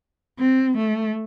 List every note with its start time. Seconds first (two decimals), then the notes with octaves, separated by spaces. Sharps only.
0.39 C4
0.78 A3